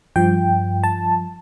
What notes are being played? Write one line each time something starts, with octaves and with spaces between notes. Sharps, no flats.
G2 F3 G5
A5